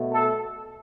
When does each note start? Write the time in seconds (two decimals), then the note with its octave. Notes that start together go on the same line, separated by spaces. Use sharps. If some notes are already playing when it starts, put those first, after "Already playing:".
Already playing: B2 A3
0.13 A4